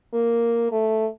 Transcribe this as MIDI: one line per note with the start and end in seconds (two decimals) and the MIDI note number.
0.14 0.70 58
0.72 1.07 57